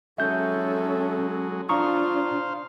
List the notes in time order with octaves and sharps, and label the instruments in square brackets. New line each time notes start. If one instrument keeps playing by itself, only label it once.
[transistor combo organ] F#3 G#3 [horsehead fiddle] C#4 A4 [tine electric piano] E5 G6
[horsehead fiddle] D4 F4 [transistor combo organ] C5 F5 [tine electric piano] A#5 C#6 D#6